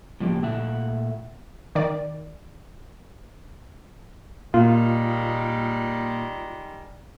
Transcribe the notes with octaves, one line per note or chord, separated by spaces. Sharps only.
A2 C#3 F3 A#3 G4
A#2 A3 E5 F#5
D#3 D5
A#2 D#3 G3 G#3 A#3 F4